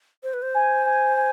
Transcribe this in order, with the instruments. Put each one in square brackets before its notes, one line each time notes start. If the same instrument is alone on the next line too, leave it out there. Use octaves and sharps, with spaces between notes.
[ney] C5
B4
C5
[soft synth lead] G#5
G#5
G#5